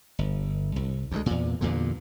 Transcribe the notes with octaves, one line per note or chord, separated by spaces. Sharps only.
G1
C2
D2 G2 G#3
E2 A#2
E2 G2 A#2 D3